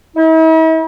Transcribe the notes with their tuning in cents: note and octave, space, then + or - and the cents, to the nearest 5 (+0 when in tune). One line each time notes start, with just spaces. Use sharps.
E4 -45